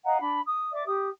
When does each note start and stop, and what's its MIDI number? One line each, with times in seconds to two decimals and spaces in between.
0.04 0.18 75
0.04 0.18 77
0.04 0.18 78
0.04 0.18 82
0.19 0.39 62
0.19 0.39 83
0.45 0.70 87
0.72 0.83 74
0.72 0.83 76
0.72 0.83 86
0.86 1.09 67
0.86 1.09 87